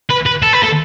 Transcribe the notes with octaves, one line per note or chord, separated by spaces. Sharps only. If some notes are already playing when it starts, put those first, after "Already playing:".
B4
B4
A4
B4
A4